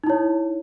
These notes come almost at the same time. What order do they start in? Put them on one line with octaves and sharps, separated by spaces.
D#4 E4 C#5